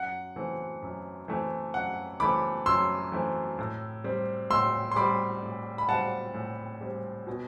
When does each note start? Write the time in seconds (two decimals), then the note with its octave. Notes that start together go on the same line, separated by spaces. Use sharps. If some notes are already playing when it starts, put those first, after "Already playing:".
Already playing: F#2 F#5
0.36 E3 A3 C4
0.82 F#2
1.28 E3 A3 C4
1.74 F#2 F#5
2.20 E3 A3 C4 B5 D6
2.66 F#2 C6 E6
3.12 E3 A3 C4
3.59 A2
4.04 G3 C4
4.51 A2 C6 E6
4.91 C6
4.96 G3 C4 B5 D6
5.43 A2
5.78 B5
5.89 G3 C4 F#5 A5
6.34 A2
6.81 G3 C4
7.27 B2